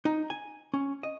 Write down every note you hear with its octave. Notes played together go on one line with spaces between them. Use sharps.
D#4
G#5
C#4
D#5